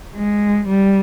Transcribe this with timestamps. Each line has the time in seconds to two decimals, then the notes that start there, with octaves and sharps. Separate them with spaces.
0.17 G#3
0.68 G3